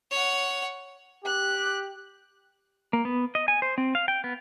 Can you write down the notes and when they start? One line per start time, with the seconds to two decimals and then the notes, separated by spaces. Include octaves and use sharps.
0.11 C#5 F#5
1.25 G4 F#6
2.93 A#3
3.05 B3
3.35 D#5
3.48 G#5
3.62 C5
3.78 C4
3.95 F5
4.08 G5
4.24 B3